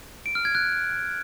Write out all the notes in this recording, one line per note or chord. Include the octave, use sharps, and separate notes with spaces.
D7
F6
G#6
F#6